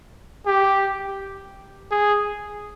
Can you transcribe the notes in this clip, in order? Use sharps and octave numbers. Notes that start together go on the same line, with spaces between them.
G4
G#4